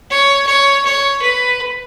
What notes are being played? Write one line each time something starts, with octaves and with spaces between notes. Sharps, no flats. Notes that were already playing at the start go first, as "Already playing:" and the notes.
C#5
C#5
C#5
B4